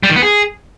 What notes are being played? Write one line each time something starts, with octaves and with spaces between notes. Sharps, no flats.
G3
D#3
B3
G#4